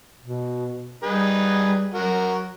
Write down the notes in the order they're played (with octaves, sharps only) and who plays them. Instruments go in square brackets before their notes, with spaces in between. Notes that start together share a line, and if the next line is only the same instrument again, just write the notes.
[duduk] B2
[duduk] G3 [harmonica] D#4 G#4 B4
[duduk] F#3 [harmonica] F#4 A#4